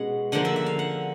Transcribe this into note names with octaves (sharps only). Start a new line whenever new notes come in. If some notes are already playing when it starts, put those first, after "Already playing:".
Already playing: B2 G#3 C#4 F#5
D3 F3 A#3 F#5
E5
E5
F5
F#5